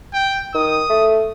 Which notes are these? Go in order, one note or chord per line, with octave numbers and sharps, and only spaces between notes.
G5
D#3 D#6
A3